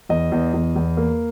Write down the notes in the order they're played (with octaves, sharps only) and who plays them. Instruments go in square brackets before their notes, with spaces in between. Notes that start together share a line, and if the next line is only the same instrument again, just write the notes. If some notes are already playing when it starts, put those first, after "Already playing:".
[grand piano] E2 D#5
E2
E2
E2
A#3